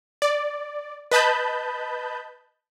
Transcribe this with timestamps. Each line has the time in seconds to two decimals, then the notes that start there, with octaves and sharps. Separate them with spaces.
0.22 D5
1.11 B4 D#5 A5 B5 G6